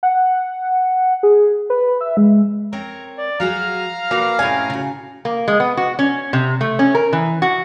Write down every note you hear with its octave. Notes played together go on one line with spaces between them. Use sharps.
F#5
G#4
B4
E5
G#3
C4 A#4 C#5 A#5
D5
F#3 F#4 G#4 F5 A#5 F6
A#3 F#4 B4
A2 C3 C#4 G#5
C#3 F#4
A#3
G#3
B3
F#4
C#4
C3
A3
C#4
A#4
E3
F#4